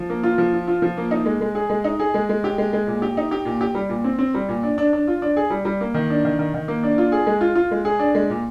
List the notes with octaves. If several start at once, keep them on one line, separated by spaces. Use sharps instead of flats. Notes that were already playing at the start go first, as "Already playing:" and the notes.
Already playing: F3
A#3
F4
F3
F4
F4
F3
A#3
D#4
G#3
G#3
G#4
G#3
D#4
G#4
G#3
G#3
G4
G#3
G#3
A#2
G4
D#4
G4
A#2
G4
G3
A#2
C4
C4
G3
A#2
D4
D4
D4
F4
D4
G#4
G3
G3
A#3
D#3
D4
D#3
D#3
D#3
A#3
D4
F4
G#4
G#3
F4
F4
G#3
G#4
D4
G#3
A#2